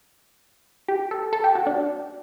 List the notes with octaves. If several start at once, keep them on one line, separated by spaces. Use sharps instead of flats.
G4
A4
A4
G4
F#4
D4